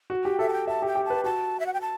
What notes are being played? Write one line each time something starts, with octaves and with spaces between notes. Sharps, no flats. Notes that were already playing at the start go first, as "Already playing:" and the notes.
F#4
G4 G5
A4 E5
A5
G5
E5 A5
G4
G5
G4
A5
B4
F#4 A5
E5
F#5
G5
A5